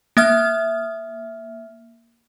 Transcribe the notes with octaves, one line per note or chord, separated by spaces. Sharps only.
A#3 E5 F6